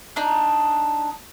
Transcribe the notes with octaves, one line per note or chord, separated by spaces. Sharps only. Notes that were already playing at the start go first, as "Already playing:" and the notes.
D4 D#4